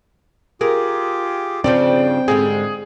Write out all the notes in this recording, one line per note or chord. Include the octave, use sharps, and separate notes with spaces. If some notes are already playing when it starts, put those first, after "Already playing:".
F4 G4 G#4 A#4
G2 C#3 F3 C4 D5 G5
G#2 D3 G3 G#4